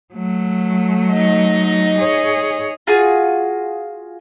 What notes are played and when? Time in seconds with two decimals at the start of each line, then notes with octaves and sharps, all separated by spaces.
0.14 F#3 A3
1.12 D#4 D#5
1.98 G#4 C#5
2.87 F4 F#4 G#4